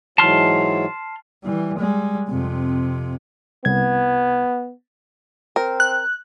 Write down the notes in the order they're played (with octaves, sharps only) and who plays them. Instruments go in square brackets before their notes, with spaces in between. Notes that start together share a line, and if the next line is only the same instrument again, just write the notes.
[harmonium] G#2 E3 F#3 [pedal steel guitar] A5 C6 F6
[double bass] E3 G3
G3 G#3
F2 C3
[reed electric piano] C2 G#6 [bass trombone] B3
[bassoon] C4 [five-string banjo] A#4
[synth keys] F#6